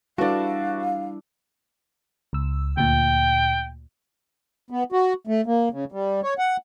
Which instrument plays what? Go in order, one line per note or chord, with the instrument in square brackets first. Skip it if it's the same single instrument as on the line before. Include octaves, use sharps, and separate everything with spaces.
[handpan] G3 E4 [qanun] D4 A4 [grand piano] F#4 B4 D5 [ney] F5
[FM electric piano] C#2 E6
[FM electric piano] D2 A#2 [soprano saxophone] G5
[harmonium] B3
F#4
A3
A#3
C#3
G3
C#5
F#5